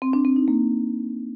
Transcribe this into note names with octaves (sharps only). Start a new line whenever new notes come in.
C4
D4
C4
D#4
A#3